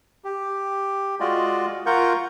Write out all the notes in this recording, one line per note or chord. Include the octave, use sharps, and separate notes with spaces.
G4
G#3 F4 F#4 D5 D#5
F4 A#4 F#5 C#6 G6